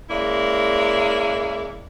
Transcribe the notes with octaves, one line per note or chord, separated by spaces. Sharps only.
G#3 A#3 C#4 E4 D5